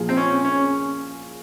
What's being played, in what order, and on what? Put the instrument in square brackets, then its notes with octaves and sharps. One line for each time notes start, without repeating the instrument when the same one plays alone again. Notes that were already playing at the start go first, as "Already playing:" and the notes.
Already playing: [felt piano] A#2 F3 A#3 F4 G#4
[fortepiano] C4
C#4
C#4